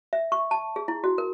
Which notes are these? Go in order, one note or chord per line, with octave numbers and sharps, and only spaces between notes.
E5
C#6
A5
G#4
E4
F#4
A#4